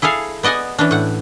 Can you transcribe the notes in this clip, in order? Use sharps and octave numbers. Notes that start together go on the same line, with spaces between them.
E4 G#4 A4 F5 G#5
B3 D5 D#5 F#5 G#5
E3 C#4 D4
A2 F#5